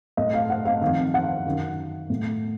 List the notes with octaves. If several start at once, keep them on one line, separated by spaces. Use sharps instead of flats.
A2 D#5
F5
F#5
F5
F2 D#3 F5
F#5
F#2 D#3
A2